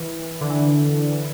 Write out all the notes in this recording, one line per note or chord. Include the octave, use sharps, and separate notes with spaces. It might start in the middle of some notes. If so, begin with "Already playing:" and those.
Already playing: E3
D3
E3